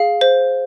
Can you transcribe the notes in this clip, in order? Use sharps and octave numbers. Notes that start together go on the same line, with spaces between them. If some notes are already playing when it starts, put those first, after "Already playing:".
Already playing: G#4 F5
C5